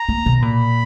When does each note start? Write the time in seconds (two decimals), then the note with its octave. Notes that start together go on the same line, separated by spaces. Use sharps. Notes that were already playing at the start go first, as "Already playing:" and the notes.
Already playing: A#5
0.09 A#3
0.26 B2
0.42 A#2 B5